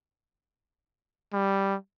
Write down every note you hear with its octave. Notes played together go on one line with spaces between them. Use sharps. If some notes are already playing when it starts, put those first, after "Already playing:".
G3